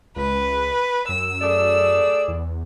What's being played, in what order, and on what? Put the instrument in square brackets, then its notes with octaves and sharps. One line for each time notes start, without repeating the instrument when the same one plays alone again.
[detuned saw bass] C#2 [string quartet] B4
[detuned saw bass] F#2 [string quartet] E6
[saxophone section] A3 G#4 D5
[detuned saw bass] E2